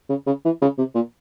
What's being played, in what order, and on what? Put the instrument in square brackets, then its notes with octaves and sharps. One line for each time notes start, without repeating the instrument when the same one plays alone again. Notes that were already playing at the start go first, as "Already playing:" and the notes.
[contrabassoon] C#3
C#3
E3
C#3
C3
A#2